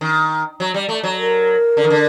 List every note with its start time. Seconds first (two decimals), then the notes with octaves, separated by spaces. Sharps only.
0.01 D#3
0.60 F#3
0.74 G3
0.89 A3
1.03 F#3
1.19 A#4
1.77 D3
1.84 D#3
1.90 D3